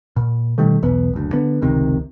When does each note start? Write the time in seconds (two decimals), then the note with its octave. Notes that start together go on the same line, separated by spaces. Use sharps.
0.16 A#2
0.58 B2 D#3 G3 A3
0.83 B1 E2 B3
1.13 F#1 D2
1.33 D3 B3
1.61 F1 C#2 C3 D#3